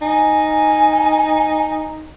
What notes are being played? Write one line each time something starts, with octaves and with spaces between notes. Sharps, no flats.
D#4 G#5